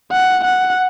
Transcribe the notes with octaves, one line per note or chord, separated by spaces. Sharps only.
F#5
F#5